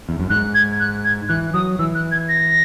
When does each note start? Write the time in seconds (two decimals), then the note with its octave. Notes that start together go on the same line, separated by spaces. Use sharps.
0.09 E2
0.20 F#2
0.30 G#2 F#6
0.54 G#6
0.80 F#6
1.05 G#6
1.29 E3 F#6
1.54 F#3 D#6
1.79 E3 E6
1.95 F#6
2.12 G#6
2.29 A#6